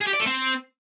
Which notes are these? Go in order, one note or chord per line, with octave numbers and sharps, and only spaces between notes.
G#4
G4
D5
A3
C4